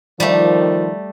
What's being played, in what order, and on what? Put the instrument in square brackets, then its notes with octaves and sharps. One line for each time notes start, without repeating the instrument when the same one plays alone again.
[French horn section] D#3 F3 [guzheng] G3 A3